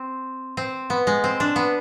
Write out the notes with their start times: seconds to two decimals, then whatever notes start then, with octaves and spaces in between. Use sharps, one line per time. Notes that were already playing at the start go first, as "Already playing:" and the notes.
Already playing: C4
0.57 C4
0.90 B3
1.07 G#3
1.24 C4
1.40 D4
1.56 B3